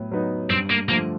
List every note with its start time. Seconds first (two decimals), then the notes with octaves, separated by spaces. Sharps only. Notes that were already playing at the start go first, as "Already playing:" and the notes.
Already playing: A2 F#3 B3
0.11 F#3 B3 D#4
0.50 G2 C4
0.70 A#3
0.88 D3 F3 A3 A#3